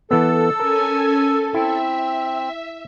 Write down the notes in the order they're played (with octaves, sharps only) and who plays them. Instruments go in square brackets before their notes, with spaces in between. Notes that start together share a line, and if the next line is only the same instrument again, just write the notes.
[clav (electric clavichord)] E3 B3 [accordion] A4 [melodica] E6
[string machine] C#4 G#5 [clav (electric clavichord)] A#4
[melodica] C4 [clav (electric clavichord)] E4 [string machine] E5